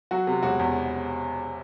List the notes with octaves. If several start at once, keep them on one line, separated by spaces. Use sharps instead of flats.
F#3 F#4
C3
E1 F#4
E2